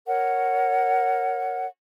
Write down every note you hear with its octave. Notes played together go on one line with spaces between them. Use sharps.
A#4 C#5 F#5